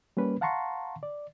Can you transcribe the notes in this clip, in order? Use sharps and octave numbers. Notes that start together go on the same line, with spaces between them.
G3 A#3 C#4 B4
F5 F#5 A5 A#5 C6 C#6
D5